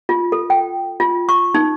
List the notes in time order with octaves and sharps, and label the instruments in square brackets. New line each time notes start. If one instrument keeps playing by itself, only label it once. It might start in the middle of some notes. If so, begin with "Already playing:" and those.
[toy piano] F4
A4
G5
F4
C#6
D#4